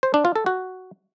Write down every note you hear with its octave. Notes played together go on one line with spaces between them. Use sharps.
C5
D4
F4
A4
F#4